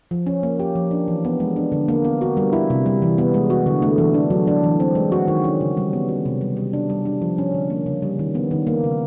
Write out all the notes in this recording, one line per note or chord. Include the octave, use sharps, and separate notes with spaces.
F3
C#4
A#3
G4
F3
D4
E3
B3
G#3
D4
D3
A#3
B3
F#4
G3
E4
C3
G3
E3
B3
G#3
F#4
D3
A3
E3
D4
F#3
D4
E3
C4
G#3
F#4
D#3
C#4
C#3
G3
B3
F#4
C3
G3
G3
D4
G3
D4
F3
C#4
D3
A#3
C#3
G3
D#3
B3
D#3
A#3
C#3